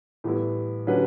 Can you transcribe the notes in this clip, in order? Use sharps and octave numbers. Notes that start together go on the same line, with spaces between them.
A2 E3 G3 B3 E4
D3 F#3 C#4 G4 B4